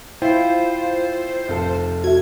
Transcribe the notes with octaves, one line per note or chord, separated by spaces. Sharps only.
E4 F4 C5 G5
F1 A4
F#4 E5 G#6